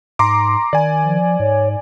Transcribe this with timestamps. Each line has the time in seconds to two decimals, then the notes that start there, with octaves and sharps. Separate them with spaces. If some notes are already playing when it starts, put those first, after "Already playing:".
0.19 G#2 A#5 C6 D6
0.73 D#3 D5 G#5
1.04 F3
1.40 G#2 C#5